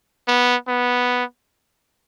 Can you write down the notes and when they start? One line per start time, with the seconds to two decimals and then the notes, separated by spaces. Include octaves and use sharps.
0.28 B3
0.68 B3